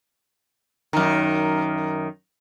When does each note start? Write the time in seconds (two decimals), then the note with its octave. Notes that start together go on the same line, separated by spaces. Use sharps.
0.93 F#2 D#3